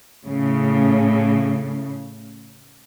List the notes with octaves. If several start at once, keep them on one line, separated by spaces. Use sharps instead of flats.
A2 C#3